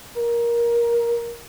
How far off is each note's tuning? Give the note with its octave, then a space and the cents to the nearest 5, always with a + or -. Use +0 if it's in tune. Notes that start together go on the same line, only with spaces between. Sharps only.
A#4 +15